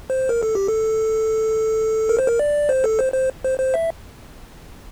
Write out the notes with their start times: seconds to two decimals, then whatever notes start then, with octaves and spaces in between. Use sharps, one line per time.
0.10 C5
0.29 A#4
0.43 A4
0.55 G4
0.68 A4
2.09 A#4
2.19 C5
2.27 A#4
2.39 D5
2.69 C5
2.84 A4
2.99 C5
3.14 C5
3.44 C5
3.60 C5
3.74 E5